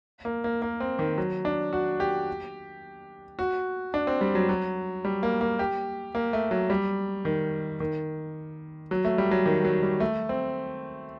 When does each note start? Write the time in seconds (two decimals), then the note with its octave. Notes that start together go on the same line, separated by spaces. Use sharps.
0.25 A#3
0.44 A#3
0.62 A#3
0.80 C4
0.99 D#3
1.18 F#3
1.45 D4
1.73 F#4
2.00 G4
3.39 F#4
3.94 D4
4.07 C4
4.21 G3
4.35 F#3
4.49 F#3
5.05 G3
5.23 A#3
5.41 A#3
5.59 G4
6.15 A#3
6.33 A3
6.51 F#3
6.70 G3
7.25 D#3
7.80 D#3
8.91 F#3
9.05 A3
9.18 G3
9.31 F#3
9.46 D#3
9.65 F#3
9.83 G3
10.00 A3
10.29 C4